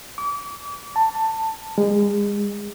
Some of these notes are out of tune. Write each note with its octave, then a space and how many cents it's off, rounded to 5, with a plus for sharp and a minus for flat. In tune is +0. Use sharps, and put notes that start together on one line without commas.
D6 -35
A5 +15
G#3 -30